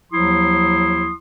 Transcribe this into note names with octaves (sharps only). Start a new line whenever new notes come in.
D#2 F3 F#3 E4 C6 D#6